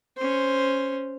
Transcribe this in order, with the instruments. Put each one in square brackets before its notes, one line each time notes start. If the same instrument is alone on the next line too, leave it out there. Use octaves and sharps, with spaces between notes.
[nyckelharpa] C#4 C5